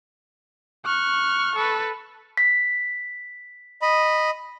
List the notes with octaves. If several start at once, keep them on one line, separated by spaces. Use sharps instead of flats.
C#6 F6 F#6
A4 B4
B6
D#5 B5